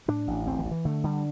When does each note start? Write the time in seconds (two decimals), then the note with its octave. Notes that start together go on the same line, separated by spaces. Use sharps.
0.08 A2 D4
0.27 A1
0.46 D2 C4
0.59 E3
0.65 D2
0.71 E3
0.85 D3 A3
1.04 D3 G3